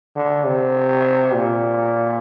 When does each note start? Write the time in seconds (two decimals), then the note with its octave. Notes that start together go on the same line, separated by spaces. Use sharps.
0.16 D3
0.46 C3
1.34 A#2